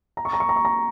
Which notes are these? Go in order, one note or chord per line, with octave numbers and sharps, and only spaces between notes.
A#5
C#6
A#5
C#6
A#5
C#6
A#5